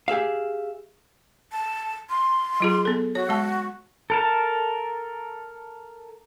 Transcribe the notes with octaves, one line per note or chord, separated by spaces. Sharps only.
G4 G#4 E5 F5
A5
C6
F#3 F4 G#4
B3 A4
F#4 C#5
G#3 A5
A4 A#4 A5